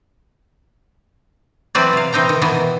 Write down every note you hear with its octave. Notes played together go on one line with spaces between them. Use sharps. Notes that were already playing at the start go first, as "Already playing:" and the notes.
E3 F#3 C4 F#4 B4 D5
C3 F5
E3 C4 D#4 G5 A#5
D#3
B2 D#3 E3 B3 F#4